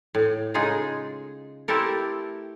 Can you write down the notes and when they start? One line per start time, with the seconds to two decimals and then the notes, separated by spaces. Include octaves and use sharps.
0.15 A2
0.54 C#3 G#3 D#4 F4 G#4 A#5
1.68 A3 C4 E4 G4 A4 A#4